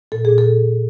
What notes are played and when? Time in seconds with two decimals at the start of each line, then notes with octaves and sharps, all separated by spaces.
0.12 A#2 A4
0.25 A#2 G#4
0.38 A4